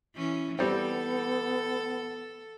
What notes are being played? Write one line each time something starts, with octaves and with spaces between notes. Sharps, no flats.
E3 C#4
G3 B3 C4 A4